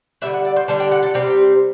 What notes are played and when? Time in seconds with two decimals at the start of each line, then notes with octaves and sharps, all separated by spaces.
0.22 D3 G3 D4 E5
0.33 F#5
0.45 D5
0.56 C5
0.68 D3 G3 D4 A5
0.80 G5
0.91 F#5
1.03 A4
1.14 C3 G3 C4 G4